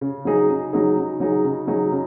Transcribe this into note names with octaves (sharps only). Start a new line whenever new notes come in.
C#3
F#3 D#4 G#4
C#3
F#3 D#4 G#4
C#3
F#3 D#4 G#4
C#3
F#3 D#4 G#4
C#3